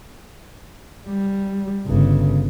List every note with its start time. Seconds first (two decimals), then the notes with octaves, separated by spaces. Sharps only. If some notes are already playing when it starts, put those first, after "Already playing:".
1.07 G3
1.87 G1 C#3